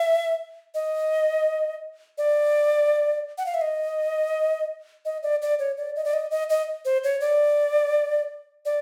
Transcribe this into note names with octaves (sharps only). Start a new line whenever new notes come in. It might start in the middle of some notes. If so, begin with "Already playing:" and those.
Already playing: E5
D#5
D5
F#5
F5
E5
D#5
D#5
D5
D5
C#5
D5
D#5
D5
D#5
D#5
D#5
C5
C#5
D5
D5